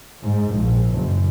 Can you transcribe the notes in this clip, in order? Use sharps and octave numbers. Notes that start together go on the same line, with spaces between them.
G#2
A#1
F#1